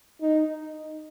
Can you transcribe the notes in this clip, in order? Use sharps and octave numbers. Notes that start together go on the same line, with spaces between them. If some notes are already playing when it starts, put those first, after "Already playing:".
D#4